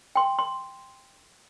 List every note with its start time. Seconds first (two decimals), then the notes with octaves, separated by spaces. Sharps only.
0.15 G5 C6
0.39 C6